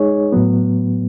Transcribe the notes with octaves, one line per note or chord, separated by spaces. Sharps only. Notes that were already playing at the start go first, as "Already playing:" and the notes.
Already playing: G#3 D#4 G#4 C#5
A2 F#3 B3